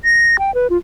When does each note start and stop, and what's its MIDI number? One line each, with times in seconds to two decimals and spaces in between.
0.04 0.37 94
0.39 0.53 79
0.55 0.67 71
0.70 0.77 65